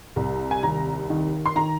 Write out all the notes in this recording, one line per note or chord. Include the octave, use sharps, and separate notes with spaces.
C2
G#5
D#2 A#5
D#3
C6
D#3 A#5